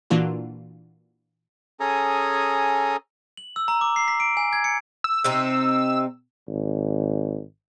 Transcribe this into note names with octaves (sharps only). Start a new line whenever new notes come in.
A#2 E3 A#3 D4 F4 F#4
C#4 G#4 A4 G#5 A#5 D#6
F#7
E6
A#5
D6
C7
B6
D7
G#5
G#6
C#7
E6
C3 C4 D#4 E6
G#1